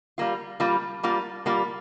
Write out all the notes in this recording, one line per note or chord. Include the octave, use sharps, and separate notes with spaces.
G3 A#3 F4
G3 A#3 F4
G3 A#3 F4
G3 A#3 F4